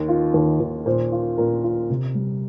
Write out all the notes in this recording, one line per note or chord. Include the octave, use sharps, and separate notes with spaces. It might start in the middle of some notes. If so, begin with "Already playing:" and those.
Already playing: D#2 D#3
F4
D#2
D#2
A#2 C5
F4
A#2 A#4
F4
C3
G3